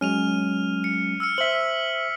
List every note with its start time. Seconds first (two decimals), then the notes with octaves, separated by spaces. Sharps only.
0.01 F#3 G#3 C#4 F6 D#7 F7
0.84 C#7
1.20 E6 F6 C#7
1.38 C5 E5 B6 F#7